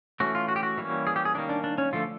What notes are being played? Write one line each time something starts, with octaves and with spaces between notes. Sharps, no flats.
E3 A3 C#4 F#4
F4
F#4
G4
F#4
E3 G3 A#3 C#4
G#4
G4
G#4
D#3 G3 A#3 C#4 D4
D4
D4
C#4
D3 F3 A3 F4